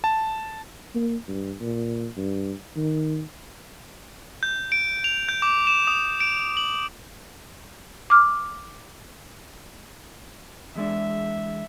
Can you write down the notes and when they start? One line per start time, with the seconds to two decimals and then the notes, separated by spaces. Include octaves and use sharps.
0.04 A5
0.95 A#3
1.28 G2
1.60 A#2
2.17 G2
2.77 D#3
4.43 G6
4.72 D7
5.04 F7
5.29 G6
5.42 D6
5.67 E7
5.87 D#6
6.20 D7
6.57 F#7
8.10 D6 F6
10.75 E2 G#3 D4 E5